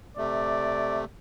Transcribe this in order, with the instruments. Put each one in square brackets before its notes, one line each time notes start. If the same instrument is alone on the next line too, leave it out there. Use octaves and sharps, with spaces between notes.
[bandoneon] C3 A3 [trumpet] D5